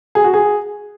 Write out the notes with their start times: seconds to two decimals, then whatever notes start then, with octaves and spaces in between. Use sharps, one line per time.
0.15 G#4
0.24 F#4
0.34 G#4